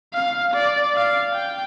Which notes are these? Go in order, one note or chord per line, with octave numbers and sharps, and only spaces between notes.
F5
D5
F5
G5